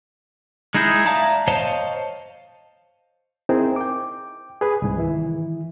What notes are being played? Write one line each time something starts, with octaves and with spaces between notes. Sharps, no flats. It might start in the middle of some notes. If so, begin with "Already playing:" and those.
G#3 D#4 E4 G#4 G6
D5 E5 F5 A5 A#5
C5 C#5 D#5 F5 A5
C4 D#4 E4 G#4 A#4 C5
G5 D6
G#4 B4 G#5
C2 G#2
D#3 E3 E4